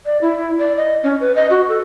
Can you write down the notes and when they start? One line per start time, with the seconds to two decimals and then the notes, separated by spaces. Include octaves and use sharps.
0.06 D5
0.21 E4
0.59 D5
0.77 D#5
1.03 C#4
1.20 B4
1.36 D#5
1.50 F#4
1.68 A4